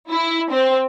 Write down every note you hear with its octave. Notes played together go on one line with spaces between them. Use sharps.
E4
C4